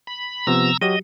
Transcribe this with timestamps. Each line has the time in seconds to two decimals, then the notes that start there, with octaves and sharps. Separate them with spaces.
0.07 B5
0.47 C3 F3 B3 A#5 E6
0.82 F#3 F#4 G4 D#5